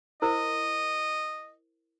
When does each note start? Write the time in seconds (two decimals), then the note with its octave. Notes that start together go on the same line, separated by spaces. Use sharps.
0.22 E4 A#4 C5 D#5